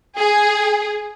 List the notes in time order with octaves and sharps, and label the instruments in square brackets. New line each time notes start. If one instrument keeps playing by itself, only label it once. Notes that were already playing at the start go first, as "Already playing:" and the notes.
[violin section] G#4